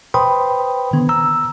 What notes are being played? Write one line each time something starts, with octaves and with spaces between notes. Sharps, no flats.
B4 C5 G5 B5 C6 D#6
D3 D#3 B3
A#5 E6